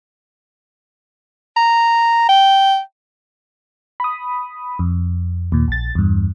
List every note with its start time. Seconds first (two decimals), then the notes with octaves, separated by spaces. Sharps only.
1.56 A#5
2.29 G5
4.00 B5 D#6
4.79 F2
5.52 D#2 A#2
5.68 A#1 A6
5.95 E2 G2